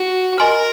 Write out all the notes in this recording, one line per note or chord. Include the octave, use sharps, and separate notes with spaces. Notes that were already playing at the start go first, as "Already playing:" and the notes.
Already playing: F#4
A#4 D#5 G#5 C6 F6